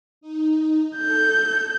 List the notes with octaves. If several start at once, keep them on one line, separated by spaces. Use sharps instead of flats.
D#4
A4 G6